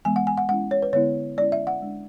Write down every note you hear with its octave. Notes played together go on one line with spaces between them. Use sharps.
E3 G#3 B3 G#5
F#5
G#5
F#5
G#3 C#4 E4 F#5
C#5
B4
D3 G#3 B3 E4 C#5
G#3 C#4 E4 D5
E5
F#5
G#3 D4